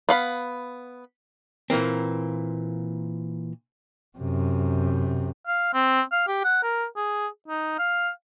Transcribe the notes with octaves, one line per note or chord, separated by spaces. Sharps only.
B3 F5 B5
A#2 E3 A#3 C4
F#2 C3
F5
C4
F5
G4
F#5
A#4
G#4
D#4
F5